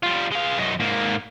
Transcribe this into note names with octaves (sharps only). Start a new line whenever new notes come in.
G3 F4
G#3 F5
F#2 D#4
G#2 A#3